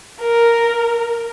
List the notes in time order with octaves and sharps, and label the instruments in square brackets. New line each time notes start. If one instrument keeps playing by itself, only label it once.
[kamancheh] A#4